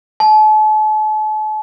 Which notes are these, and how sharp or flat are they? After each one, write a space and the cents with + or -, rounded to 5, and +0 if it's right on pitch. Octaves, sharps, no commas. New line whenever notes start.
A5 -40